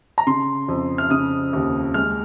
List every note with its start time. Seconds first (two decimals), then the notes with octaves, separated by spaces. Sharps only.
0.18 A#5
0.27 C#3 C6
0.68 F2
0.98 F6
1.10 C#3 D#6
1.53 D#2
1.94 G#3 F6